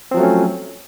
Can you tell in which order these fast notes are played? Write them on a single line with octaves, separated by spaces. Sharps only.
C4 F3 F#3 A3 C#4